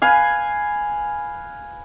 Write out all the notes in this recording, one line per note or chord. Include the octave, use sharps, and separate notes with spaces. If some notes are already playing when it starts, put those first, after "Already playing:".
B4 F5 G#5